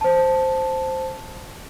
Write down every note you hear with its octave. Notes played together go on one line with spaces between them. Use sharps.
C5 A5